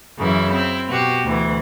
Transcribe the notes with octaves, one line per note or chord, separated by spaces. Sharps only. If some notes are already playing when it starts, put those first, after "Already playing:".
F#2 C#3 E3 E4
C4 E4
B2 F#4 G4
D2 E3